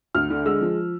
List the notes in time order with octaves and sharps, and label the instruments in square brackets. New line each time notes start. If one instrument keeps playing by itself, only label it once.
[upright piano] D2 F6
D3
G#3 E6
F3